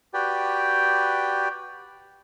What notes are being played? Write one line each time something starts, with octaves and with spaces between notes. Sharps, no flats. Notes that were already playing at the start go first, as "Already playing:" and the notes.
F#4 G4 B4 D5 G5